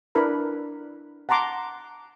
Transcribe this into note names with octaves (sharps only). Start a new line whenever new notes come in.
D4 E4 A#4 B4 B5
F#5 A5 A#5 C6 D6